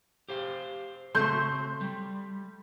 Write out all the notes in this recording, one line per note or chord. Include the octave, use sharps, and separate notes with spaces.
G4 C5 F5
C#3 A3 C4 F#4 C6 G6
G3